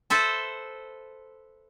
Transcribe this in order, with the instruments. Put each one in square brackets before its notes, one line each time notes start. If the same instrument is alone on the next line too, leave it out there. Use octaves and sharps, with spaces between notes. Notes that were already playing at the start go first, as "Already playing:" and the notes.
[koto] A4 B4 C5 E5 A5